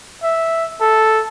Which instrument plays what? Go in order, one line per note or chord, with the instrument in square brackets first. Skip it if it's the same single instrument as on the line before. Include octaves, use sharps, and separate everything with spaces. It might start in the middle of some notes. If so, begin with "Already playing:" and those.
[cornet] E5
A4